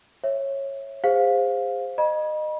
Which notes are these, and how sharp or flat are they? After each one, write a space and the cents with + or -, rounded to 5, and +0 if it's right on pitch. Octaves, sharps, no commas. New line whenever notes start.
C#5 -15 E5 +0
G#4 -40 C5 +0 F5 +10
D#5 -25 B5 -40